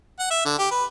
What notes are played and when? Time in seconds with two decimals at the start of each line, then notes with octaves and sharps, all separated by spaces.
0.19 F#5
0.31 E5
0.45 D3
0.59 G4
0.71 B4